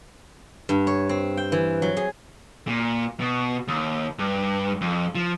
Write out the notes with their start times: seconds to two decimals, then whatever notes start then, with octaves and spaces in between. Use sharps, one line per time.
0.69 G2
0.87 C#5
1.09 C4
1.37 G5
1.52 E3
1.82 F#3
1.97 G#4
2.68 A#2
3.20 B2
3.68 D#2
4.19 G2
4.81 F2
5.15 F3